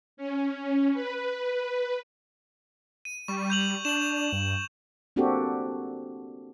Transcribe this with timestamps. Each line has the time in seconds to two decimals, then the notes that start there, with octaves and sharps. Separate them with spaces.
0.17 C#4
0.94 B4
3.05 D#7
3.28 G3 C#6
3.50 G6 F7 F#7
3.85 D4 E7 F#7
4.33 G2
5.16 A#3 C4 D4 F#4 G4 A4